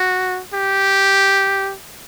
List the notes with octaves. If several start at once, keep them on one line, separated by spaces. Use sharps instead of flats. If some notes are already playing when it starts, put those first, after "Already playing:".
Already playing: F#4
G4